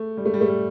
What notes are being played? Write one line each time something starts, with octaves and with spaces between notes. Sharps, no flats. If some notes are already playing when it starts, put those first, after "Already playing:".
Already playing: A3
G3
A3
G3
A3
G3